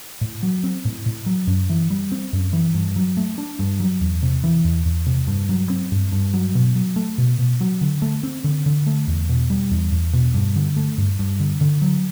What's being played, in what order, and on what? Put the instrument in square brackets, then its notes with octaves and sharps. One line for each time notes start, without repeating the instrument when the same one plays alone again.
[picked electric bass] A2
F#3
C4
A2
A2
F#3
F#2
E3
G3
C4
F#2
E3
G2
F#3
A3
D4
G2
F#3
E2
C3
E3
E2
E2
C3
G2
F#3
C4
G2
G2
F#3
B2
F#3
A3
B2
B2
F#3
D3
A3
C4
D3
D3
A3
E2
B2
G3
E2
E2
B2
G2
D3
A3
G2
G2
D3
D3
F#3